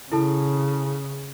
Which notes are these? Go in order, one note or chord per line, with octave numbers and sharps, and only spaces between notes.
C#3 E4 A4 A5